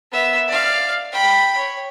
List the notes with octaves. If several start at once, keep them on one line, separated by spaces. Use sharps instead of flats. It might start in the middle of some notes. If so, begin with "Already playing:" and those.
B3 E5
D5 F5
G5 B5
C#5